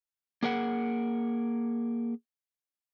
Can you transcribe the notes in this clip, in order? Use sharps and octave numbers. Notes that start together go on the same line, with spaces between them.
A#3 G#4 A#4 F#5